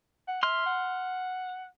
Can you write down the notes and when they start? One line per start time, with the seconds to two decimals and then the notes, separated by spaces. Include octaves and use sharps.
0.28 F#5
0.43 E5 C6 F6
0.66 F#5